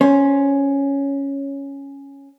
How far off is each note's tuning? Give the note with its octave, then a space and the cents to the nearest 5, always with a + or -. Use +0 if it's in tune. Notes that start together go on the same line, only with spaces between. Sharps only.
C#4 +0 C5 +15